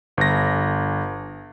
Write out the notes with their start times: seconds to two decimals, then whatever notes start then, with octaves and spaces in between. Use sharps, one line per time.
0.17 G1 A#6